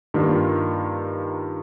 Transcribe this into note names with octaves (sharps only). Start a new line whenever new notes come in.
G2 D#3 A#3 F4